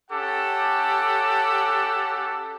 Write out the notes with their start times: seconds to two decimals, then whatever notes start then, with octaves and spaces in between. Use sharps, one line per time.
0.11 C#4 G4 A4 F#5 A5 D6